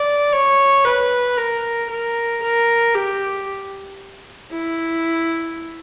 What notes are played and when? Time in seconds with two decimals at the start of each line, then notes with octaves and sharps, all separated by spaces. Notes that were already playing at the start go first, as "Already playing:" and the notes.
Already playing: D5
0.33 C#5
0.85 B4
1.37 A#4
1.90 A#4
2.43 A#4
2.95 G4
4.52 E4